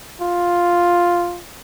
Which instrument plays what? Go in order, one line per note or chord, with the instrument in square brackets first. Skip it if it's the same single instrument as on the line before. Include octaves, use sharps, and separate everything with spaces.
[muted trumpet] F4